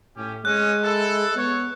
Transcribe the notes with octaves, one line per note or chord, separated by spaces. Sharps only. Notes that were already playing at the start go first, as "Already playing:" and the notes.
A2 C#4 G4
G#3 C#4 C#5 D#5 F#6
E4 A4
B3 C#5